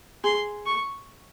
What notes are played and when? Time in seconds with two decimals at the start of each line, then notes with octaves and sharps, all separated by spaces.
0.24 G#4 C6
0.66 C#6